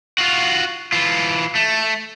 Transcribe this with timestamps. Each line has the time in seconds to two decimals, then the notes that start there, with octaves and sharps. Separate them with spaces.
0.18 F4 F#4
0.92 E3 F4
1.55 A3